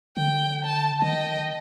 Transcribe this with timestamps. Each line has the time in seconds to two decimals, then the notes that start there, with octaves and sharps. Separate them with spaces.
0.17 D3 G5
0.65 A5
1.02 D#3 D#5 G5